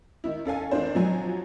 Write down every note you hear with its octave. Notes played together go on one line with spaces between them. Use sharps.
D#3 E4
C#4 A4 F5 G#5
D#3 C4 D4 C5
F3 F#3 G#5